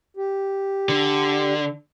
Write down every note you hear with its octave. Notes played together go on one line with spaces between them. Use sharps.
G4
D3